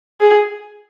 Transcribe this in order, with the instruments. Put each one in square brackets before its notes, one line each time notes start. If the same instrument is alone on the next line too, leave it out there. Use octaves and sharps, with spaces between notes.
[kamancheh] G#4